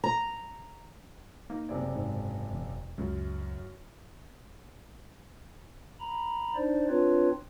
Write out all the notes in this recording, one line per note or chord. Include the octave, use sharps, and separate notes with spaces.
A#5
A#3 D#4
F#1 C3 D5
G#2
E1
C#2 F#2
A#5 B5
D4 D#4 C5 D5
C4 D4 F4 B4 C#5